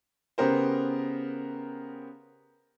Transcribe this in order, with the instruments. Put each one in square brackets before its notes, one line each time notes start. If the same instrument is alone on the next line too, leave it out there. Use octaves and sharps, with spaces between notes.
[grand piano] C#3 B3 G4 A#4 C5